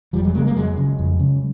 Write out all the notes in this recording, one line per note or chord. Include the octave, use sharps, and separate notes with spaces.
F2 F3 G3
F#3 G#3
C#3 G#3 A#3
G#3 A#3
F2 F#3 G#3
C#3
F2
C#3